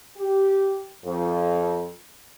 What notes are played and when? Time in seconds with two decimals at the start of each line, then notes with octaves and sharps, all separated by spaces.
0.18 G4
1.05 F2